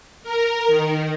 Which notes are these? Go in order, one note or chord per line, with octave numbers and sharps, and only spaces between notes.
A#4
D#3